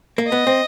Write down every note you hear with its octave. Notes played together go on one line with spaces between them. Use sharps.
A#3
B3 D#5
C4